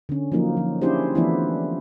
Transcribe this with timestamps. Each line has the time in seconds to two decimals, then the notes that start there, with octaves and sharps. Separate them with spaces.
0.09 D3 C#4
0.32 F3 F#3 A#3 D#4
0.57 F3
0.82 C#4 D4 E4 G4 G#4 C5
1.15 E3 F3 A3 B3 D4 E4